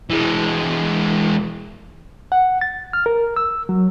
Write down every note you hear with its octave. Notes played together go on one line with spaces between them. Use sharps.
E3 G#3
F#5
A6
F6
A#4
E6
F#3